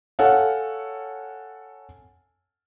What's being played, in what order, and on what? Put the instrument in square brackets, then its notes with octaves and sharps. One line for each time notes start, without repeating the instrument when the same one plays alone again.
[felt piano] A4 C#5 F5 F#5 G#5